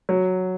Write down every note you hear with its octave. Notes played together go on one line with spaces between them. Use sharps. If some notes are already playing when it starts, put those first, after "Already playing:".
F#3